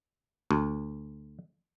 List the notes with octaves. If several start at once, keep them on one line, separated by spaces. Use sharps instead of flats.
D2